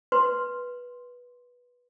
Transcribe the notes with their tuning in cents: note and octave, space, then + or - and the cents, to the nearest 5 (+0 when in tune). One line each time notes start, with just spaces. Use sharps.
B4 -15 C6 +0